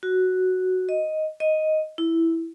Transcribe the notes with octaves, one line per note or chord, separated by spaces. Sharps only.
F#4
D#5
D#5
E4